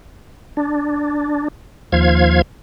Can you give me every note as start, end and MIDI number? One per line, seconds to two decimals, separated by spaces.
0.57 1.48 62
1.92 2.42 39
1.92 2.42 53
1.92 2.42 77
1.92 2.42 92